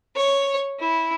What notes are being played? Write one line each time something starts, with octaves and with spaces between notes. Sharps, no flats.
C#5
E4